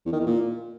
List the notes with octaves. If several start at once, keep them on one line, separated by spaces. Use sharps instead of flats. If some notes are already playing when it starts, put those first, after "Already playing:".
E2
D#3
E2
A#2